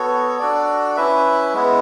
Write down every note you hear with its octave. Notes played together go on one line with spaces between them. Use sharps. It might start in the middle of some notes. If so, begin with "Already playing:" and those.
Already playing: B3 F#4 A4 C#5
D4 F#4 A4 D5
C#4 E4 B4 E5
G#3 B3 E4